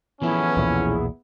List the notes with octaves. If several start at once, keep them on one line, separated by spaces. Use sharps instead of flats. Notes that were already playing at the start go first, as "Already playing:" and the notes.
E3 F3 B3 C#4 E4 G#4 A4
B1 E2 A#2